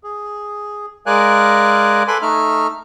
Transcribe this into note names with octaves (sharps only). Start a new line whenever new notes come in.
G#4
G#3 A#4 D5 F5 G#5 F#6
A4 B4 G#5 B5 C6 D6
A3 D#4 E5 F6